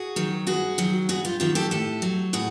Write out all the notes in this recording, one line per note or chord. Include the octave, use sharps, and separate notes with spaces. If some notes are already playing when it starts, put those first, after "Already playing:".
Already playing: F#4 G#4
D#3 F#3
G2 F#4 G#4
D#3 F#3
G2 F#4 G#4
F4 G4
D#3 F#3 F4 G4
G4 A4
A2 G4 A4
F#3
A2 F#4 G#4